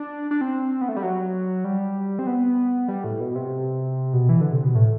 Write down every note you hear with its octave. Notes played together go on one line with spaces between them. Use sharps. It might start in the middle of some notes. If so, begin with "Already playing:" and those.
Already playing: D4
D4
C4
B3
A3
G3
F#3
G3
C4
B3
G3
A2
B2
C3
B2
E3
D3
C3
B2
A2